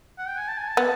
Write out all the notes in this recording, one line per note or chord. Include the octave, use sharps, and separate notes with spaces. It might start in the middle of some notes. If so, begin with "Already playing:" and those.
F#5
G5
G#5
A5
G#5
A5
B3